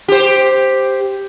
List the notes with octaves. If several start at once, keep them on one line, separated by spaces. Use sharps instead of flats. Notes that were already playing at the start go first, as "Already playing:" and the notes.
G4 C5